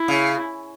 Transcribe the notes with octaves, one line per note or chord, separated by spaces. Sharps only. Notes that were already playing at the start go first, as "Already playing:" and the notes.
Already playing: E4
C#3